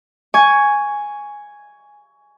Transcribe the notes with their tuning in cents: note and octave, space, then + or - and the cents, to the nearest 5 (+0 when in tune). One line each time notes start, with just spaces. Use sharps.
G#5 +0 C#6 +15